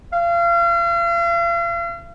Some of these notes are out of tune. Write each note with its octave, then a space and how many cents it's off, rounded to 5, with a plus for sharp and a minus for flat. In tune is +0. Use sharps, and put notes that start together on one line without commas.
F5 -40